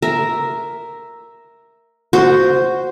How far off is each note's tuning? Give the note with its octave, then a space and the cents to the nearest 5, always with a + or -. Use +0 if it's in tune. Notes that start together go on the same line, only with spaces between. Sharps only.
A#4 +0 E5 +0
F#4 +0 C5 -5